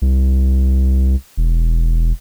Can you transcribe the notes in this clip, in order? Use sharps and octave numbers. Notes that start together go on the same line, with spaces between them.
C2
E1